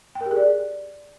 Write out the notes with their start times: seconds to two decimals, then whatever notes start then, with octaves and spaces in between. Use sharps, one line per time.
0.15 G5
0.21 A#4
0.26 G4
0.31 G#4
0.36 D5